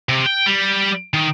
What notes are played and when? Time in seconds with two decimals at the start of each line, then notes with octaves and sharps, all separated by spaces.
0.09 C3
0.26 G5
0.46 G3
1.13 D#3